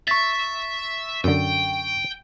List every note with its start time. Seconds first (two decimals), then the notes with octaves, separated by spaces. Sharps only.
0.08 E5 C#6 A6
1.24 F#2 D3 G5